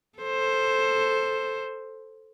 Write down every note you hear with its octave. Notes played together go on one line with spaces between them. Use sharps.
A4 C5